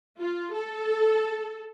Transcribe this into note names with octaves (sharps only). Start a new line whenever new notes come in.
F4
A4